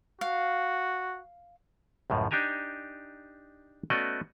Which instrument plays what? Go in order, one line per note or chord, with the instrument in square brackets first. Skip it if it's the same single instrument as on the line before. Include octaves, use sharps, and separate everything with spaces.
[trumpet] F#4 [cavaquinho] F5
[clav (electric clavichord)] C#2 F#2 A2 F3
D4 D#4 G4 G#5 A#5
A3 B3 C#4 F#4 D5 D#5